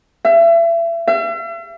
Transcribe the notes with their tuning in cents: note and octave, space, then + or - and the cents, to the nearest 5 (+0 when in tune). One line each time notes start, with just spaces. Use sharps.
E5 +35
E5 +45